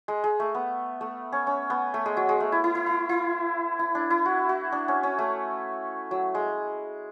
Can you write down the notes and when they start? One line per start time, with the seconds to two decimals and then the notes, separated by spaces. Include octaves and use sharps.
0.08 G#3
0.24 G#3
0.40 A3
0.54 B3
1.01 A3
1.32 C#4
1.47 C#4
1.70 B3
1.94 A3
2.06 G#3
2.17 F#3
2.29 G#3
2.40 A3
2.52 E4
2.64 E4
2.75 E4
2.86 E4
3.09 E4
3.79 E4
3.95 D4
4.10 E4
4.25 F#4
4.49 F#4
4.72 D4
4.88 C#4
5.03 C#4
5.19 A3
6.11 F#3
6.35 G#3